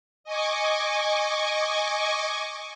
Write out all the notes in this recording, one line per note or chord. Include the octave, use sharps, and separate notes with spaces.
D#5 G#5 C#6 D6